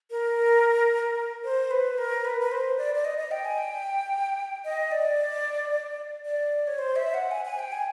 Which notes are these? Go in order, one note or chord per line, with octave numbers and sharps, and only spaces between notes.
A#4
C5
B4
A#4
B4
B4
C5
D5
D5
D#5
D#5
G5
G#5
G5
D#5
D5
D5
C#5
C5
E5
F#5
G#5
G#5
G5
G#5